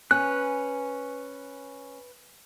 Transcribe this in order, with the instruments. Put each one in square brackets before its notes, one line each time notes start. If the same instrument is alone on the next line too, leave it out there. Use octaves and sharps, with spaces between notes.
[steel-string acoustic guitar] C#4 [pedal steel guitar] B4 F#6